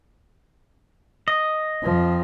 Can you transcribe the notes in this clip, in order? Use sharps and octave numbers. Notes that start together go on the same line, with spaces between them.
D#5
F2 F3